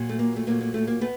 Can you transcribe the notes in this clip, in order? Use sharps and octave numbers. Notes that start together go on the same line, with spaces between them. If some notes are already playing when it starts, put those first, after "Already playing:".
Already playing: A#2 F#3
A3
A#3
A3
A#2 F#3 A3 A#3
A#3
A3
A#3
A3 B3